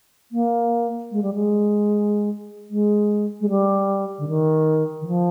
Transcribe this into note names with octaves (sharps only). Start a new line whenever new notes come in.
A#3
G#3
G3
G#3
G#3
G#3
G3
D3
D#3
D#3
F3